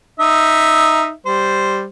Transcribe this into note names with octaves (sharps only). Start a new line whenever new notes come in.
D#4 E5
G3 C5